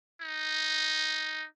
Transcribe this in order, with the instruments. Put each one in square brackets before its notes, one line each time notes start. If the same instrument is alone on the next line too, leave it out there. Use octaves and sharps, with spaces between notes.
[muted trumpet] D#4